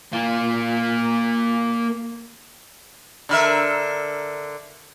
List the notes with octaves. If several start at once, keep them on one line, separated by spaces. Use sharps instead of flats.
A#3 F4
D3 A#4 E5